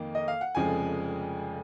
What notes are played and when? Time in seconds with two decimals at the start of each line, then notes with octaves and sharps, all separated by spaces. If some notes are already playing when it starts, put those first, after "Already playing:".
Already playing: F2 D#3 A#3 D#4
0.15 D#5
0.28 F5
0.41 F#5
0.55 F1 F2 C#3 F3 G#3 G#5